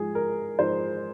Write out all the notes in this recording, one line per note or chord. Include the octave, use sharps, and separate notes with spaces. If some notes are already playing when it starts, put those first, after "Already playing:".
Already playing: G#2 F3 G#3 G#4
A#4
G#2 F3 G#3 C5